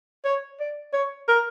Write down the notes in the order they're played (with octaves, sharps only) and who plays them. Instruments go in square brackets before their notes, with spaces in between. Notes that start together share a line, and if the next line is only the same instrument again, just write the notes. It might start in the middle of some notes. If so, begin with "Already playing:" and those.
[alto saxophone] C#5
D5
C#5
A#4